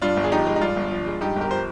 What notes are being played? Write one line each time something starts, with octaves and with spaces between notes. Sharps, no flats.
G2 D4 F4
G1
G#4
F3 D#4 G4
G#3
D#4
G2 D4 F4
G1
F3
G#3
G2 D#4 G4
G1
G4 A#4
F3 C5